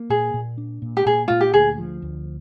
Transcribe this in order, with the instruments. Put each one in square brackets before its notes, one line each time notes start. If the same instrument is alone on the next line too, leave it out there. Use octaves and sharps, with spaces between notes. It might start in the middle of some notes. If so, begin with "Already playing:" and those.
Already playing: [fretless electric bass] A#3
[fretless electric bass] A#2 [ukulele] G#4
[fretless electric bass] A#2
D4
A#2
[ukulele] G4
[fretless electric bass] A#2 [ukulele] G#4
[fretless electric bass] A#2 [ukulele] F4
[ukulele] G4
[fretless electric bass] D2 [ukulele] G#4
[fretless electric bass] F3
D2